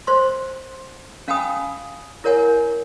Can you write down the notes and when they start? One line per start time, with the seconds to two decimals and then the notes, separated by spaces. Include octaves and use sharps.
0.07 C5 C6
1.28 C#4 F5 G5 G#5 B5 D#6
2.24 E4 A#4 C#5 F#5 G#5